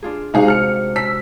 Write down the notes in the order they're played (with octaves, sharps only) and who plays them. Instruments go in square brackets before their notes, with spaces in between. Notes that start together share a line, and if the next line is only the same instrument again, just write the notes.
[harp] D4 F4 G#4
[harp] C3 G#3 F#4 [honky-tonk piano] D#4 G#4 F5
[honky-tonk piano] F6 C#7
E6 B6